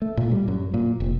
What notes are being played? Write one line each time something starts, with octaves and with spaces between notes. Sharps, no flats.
A3
A#2
G3
F#2
A#2
F1